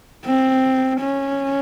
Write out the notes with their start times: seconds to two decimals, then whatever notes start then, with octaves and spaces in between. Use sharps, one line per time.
0.26 C4
1.01 C#4